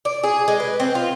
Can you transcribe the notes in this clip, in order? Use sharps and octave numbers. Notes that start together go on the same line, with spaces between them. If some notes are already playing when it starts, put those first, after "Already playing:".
D5
G#4
G#3
B4
C4
F4